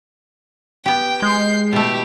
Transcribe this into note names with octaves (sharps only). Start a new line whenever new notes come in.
B3 G4 G5
G#3 G6 C7
B2 A3 E4 G4